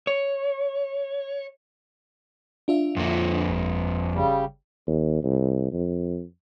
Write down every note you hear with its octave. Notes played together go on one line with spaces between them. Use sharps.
C#5
D4 F4 E5
F2 A#3
G1
C#3 G3
D#2
C2
F2